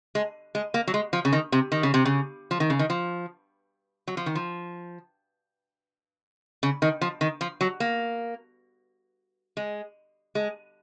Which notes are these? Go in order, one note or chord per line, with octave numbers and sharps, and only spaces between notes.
G#3
G#3
A#3
F#3
G#3
F3
C#3
D#3
C3
D#3
C#3
C3
C#3
F3
D#3
C#3
D#3
F3
F#3
F3
D#3
F3
C#3
D#3
F3
D#3
F3
F#3
A#3
G#3
G#3